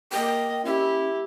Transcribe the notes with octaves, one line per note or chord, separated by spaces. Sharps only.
A#3 D#5 G5
C#4 E4 G4